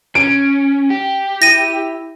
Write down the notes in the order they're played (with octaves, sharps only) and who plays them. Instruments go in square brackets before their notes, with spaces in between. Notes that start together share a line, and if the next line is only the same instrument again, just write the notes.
[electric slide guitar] C#4 [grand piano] D7
[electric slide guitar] G4
[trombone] E4 [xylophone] A#6 D#7